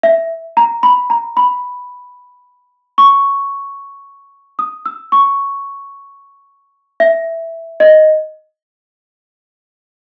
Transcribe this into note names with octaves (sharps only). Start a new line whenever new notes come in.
E5
A#5
B5
A#5
B5
C#6
D#6
E6
C#6
E5
D#5